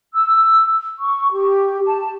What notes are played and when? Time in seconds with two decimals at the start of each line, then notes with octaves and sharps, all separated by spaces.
0.13 E6
0.99 C#6
1.32 G4
1.85 A5